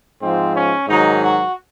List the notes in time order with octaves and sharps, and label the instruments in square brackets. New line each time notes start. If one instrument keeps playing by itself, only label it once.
[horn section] G#2 F3 C4
C#4
G#2 D#3 F#3 D#4
F#4